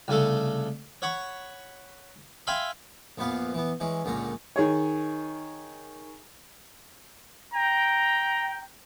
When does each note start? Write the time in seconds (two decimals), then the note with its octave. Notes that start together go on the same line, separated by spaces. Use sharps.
0.08 C2 C#3 A3 A4
1.02 C#5 F#5 B5 C#6
2.47 E5 F5 G5 G#5 B5 C6
3.18 A#1 F#2 A#2 B3 B4 F5
3.54 E3 B3
3.80 E3 G#3 C#4
4.05 C#2 F#2 A#2 D3 C#4 A#5
4.56 D#3 G#4 C#5
7.54 G5 A#5